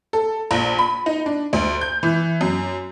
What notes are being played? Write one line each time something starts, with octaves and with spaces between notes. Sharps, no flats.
A4
A#1
B5
D#4
D4
D2
G6
E3
F#2